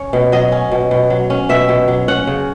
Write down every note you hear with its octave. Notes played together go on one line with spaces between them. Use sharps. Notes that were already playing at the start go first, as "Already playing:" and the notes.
Already playing: C#4 C#5
B2
F#3 D#5
C#4
B2
B2
F#3
C#4
B2 E5
B2
F#3
C#4 F#5
C#3